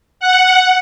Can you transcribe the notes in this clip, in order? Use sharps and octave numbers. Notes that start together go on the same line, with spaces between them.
F#5